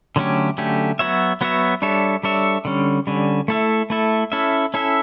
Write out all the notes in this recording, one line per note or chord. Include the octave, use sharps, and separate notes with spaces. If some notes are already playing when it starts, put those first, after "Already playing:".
D3 F#3 A3 C#4 G4
D3 F#3 A3 C#4 G4
F#3 B3 F#4 C#5 E5
F#3 B3 F#4 C#5 E5
G3 D4 A4 C#5 E5
G3 D4 A4 C#5 E5
D3 G3 C#4
D3 G3 C#4
A3 E4 A4 E5
A3 E4 A4 E5
C#4 E4 A4 E5
C#4 E4 A4 E5